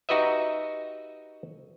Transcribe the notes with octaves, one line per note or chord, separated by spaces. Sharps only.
D#4 F#4 G4 B4 D#5 E5